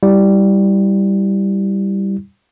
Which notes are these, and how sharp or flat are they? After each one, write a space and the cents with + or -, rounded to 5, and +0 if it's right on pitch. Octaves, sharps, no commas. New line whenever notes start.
G3 +0 E4 +0